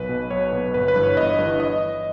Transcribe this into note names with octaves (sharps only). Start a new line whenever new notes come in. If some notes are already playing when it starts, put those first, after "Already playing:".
Already playing: B1 B4
B2
B1 C#5
B2
G1 B4
B4
G2 E3
C#5
G1 D#5
G2 E3
D#5